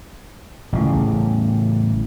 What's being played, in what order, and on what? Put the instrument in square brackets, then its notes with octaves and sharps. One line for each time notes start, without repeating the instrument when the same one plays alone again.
[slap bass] A1 C#3